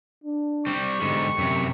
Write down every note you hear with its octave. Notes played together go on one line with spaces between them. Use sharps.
D4
G3 C4 C#6
G#2 D3 G4
F#2 C3